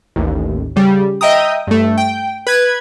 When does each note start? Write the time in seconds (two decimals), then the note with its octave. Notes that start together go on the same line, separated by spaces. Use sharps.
0.16 A1 D#2
0.76 C#3 G3
1.21 D#5 E5 G5 A#5 D#6
1.67 G2 A3
1.98 G5
2.47 B4 G#6